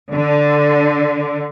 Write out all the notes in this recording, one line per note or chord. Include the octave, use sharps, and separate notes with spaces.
D3